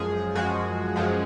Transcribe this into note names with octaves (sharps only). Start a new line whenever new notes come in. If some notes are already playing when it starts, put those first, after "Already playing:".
Already playing: F#2 F3 G#3 G#4
F#2 F3 G#3 F#4
F#2 F3 G#3